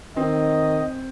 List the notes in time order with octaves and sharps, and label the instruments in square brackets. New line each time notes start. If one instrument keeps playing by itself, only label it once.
[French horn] D#3 [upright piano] C4 [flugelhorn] D#5